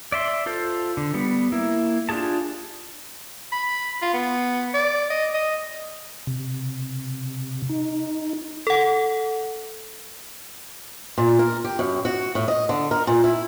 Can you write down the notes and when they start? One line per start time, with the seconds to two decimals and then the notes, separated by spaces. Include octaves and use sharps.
0.12 D5 E5 C6
0.46 F4 A4 C5
0.97 D3
1.14 G3 B3
1.52 A#3 E4
2.09 D4 F4 G4 G#4 A5
3.52 B5
4.02 F4
4.14 B3
4.74 D5
5.10 D#5
5.34 D#5
6.27 C3
7.69 D#4
8.67 A4 F#5
11.18 A#2
11.39 A#4
11.65 G4
11.79 F#2
12.05 F#4
12.35 A2
12.48 D#5
12.69 D3
12.91 A#4
13.07 A#2
13.24 E4